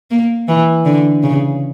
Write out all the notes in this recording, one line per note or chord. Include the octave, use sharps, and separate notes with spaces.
A#3
E3
D3
C#3